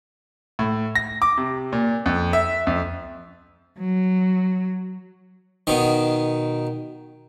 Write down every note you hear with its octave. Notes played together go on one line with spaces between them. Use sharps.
A2
A#6
D6
C3
A#2
F2
E5
F2
F#3
B2 D#3